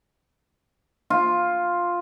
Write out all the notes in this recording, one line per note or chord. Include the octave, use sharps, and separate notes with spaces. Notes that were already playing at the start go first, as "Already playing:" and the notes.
F4